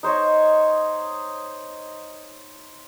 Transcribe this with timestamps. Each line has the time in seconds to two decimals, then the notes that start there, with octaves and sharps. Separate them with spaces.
0.03 D#4 C5 C#5 D#5